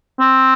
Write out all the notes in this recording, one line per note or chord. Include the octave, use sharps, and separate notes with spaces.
C4